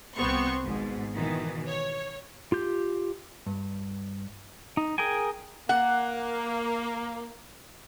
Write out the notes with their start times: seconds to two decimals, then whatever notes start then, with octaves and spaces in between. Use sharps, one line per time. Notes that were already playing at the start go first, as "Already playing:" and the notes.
0.17 C2 B3 C4 C6 C#6
0.64 G#1 G#2 B2
1.13 B2 D#3 E3
1.67 C#5
2.52 F4 G4 G6
3.46 G2
4.77 D#4
4.98 G#4 A#4 G5 G#5
5.69 A#3 F#5